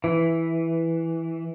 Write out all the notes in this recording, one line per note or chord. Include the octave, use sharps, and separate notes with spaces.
E3